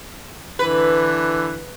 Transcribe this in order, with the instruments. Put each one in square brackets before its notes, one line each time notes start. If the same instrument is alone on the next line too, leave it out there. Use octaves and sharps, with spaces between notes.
[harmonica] D3 E3 [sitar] B4